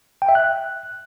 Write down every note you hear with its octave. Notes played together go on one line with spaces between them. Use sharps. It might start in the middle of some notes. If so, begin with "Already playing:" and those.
G5
E5
F#6